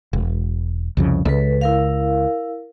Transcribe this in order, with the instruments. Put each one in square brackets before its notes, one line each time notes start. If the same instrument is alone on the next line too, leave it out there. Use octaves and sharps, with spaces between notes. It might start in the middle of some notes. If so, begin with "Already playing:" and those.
[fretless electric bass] E1
C2 F2 C#3
[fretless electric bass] C#2 [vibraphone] A4 B4
[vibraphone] E4 A#4 F5